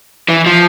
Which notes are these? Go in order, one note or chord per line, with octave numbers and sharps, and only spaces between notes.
E3
F3